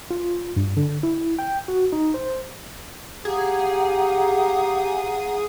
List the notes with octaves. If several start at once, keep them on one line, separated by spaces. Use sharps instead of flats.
F4
G2
D3
E4
G5
F#4
D#4
C5
G4 G#4 F5 F#5 A#5